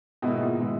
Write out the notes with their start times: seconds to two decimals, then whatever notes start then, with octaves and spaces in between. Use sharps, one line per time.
0.22 G#2 B2 D#3 G#3 B3 E4
0.41 A#2
0.60 C#3 G#3 B3 E4